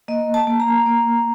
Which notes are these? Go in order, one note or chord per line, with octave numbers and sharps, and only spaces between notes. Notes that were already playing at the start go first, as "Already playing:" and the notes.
A#3 D#5
A5
A#3
A#5
A#3